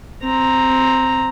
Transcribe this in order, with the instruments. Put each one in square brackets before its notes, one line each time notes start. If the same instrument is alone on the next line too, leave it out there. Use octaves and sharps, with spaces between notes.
[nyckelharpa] C4 A#5